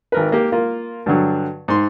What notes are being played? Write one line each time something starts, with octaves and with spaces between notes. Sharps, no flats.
G#1 A#4 B4
A#3 G4
A#3 F4
G2 D3 F#3
G#2 C6